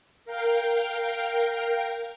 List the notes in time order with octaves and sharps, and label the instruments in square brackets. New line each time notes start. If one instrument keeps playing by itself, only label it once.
[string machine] A#4 F5 G5